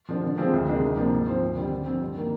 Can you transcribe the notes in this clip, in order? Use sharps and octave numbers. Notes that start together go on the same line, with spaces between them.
D3 F3
D3
F3 G#3 C4 F4
D2
C3 D#3 G#3 D4
D2
C3 F3 A#3 D4
G#2
F3 C4 F4 C5
D2
D3 G3 C4
D3
F3 C4
G2
D#3 A#3